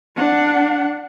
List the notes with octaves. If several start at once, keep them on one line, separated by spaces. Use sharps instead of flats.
D4 F#5